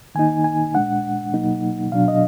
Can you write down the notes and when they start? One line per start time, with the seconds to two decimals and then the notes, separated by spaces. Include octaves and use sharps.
0.15 D#3 A#3 D#4 G#5
0.44 G#5
0.75 A#2 G#3 D4 F#5
1.34 B2 F#3 A#3 D#4
1.92 B2 F#3 D4 F5
2.08 D#5